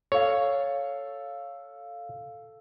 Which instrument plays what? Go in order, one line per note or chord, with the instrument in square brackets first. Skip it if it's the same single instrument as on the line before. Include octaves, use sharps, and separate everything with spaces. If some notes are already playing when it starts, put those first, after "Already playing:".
[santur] A4 F5 [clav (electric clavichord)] C#5